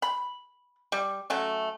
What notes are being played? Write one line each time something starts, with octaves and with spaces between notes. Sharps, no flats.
B5
G3
F#3 A3 C#4